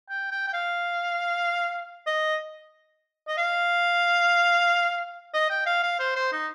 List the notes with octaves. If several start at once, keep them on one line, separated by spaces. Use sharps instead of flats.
G5
G5
G5
F5
D#5
D#5
F5
D#5
G5
F5
F5
C5
C5
D#4